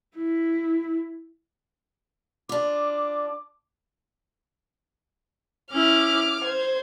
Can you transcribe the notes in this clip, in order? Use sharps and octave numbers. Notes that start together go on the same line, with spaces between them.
E4
D4 F4 D6
C#4 E4 D6 F6
C5 G#6